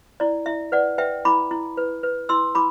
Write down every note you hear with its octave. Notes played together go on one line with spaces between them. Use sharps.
E4 D5
E4 E5
B4 D5 F#5
B4 E5 G5
E4 B5 D6
E4
B4
B4
E4 C6 E6
E4 B5 D6